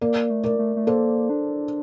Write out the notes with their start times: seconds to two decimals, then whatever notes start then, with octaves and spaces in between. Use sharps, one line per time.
0.01 A#3 A#4 D5
0.30 A3
0.44 A#4 D5
0.59 A3
0.76 A3
0.87 A#3 A4 C5
1.30 D4